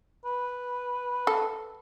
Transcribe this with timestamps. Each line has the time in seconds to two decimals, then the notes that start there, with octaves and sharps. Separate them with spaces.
0.25 B4
1.27 A4